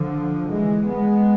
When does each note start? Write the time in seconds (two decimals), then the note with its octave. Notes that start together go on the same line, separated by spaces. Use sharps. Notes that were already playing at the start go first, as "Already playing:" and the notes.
Already playing: D3 F3
0.49 E3 G#3
0.88 G#3 B3